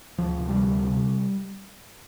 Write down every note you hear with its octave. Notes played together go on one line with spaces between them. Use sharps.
D2 F3
C3
G3
D2
C3